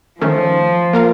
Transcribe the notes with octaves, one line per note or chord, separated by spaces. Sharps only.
D#3 F3 A3 C#4
A#3 F4 A#4 F5